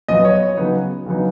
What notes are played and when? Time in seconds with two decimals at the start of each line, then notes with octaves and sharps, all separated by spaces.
0.08 A#2 F#3 B3 F4 D#5
0.25 C#5
0.57 C#3 F#3 B3 D#4
1.06 C#3 F#3 B3 D#4